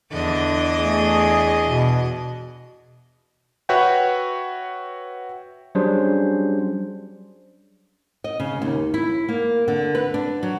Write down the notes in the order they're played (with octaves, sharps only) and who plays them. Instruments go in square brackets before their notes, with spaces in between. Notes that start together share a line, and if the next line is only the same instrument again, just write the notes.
[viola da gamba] E2 D4 D#5 [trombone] D3
[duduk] A3 [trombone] G#4
[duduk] B2
[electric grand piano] F#4 B4 C#5 E5 F#5 G5
[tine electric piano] F#3 G3 C#4 D4 G#4 C5
[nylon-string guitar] D#5
C#3
D#2
E4
A#3
D3
B4
D4
F#3